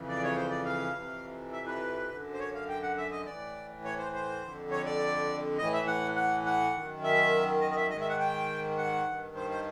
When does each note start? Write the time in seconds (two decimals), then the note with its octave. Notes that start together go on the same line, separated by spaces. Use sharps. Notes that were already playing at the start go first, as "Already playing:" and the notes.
Already playing: F2 C#3 E3
0.09 D5
0.23 C#5
0.36 C5
0.50 D5
0.65 F5
0.94 F2 C3 E3
1.52 E5
1.66 B4
2.11 F#2 D3
2.33 C5
2.40 C#5
2.54 F5
2.69 G5
2.82 F#5
2.97 E5
3.11 D#5
3.26 A2 E3 D5
3.84 C#5
3.98 C5
4.13 C5
4.42 F2 D3
4.72 C#5
4.86 D5
5.58 A2 E3 D#5
5.73 E5
5.87 F#5
6.16 F#5
6.46 F#5
6.74 F#2 D#3
7.03 E5
7.61 D#5
7.71 D#5
7.76 E5
7.90 G#2 D#3 D#5
8.01 E5
8.09 F#5
8.20 G5
8.78 F#5
9.07 G2 D#3
9.36 C5
9.50 C5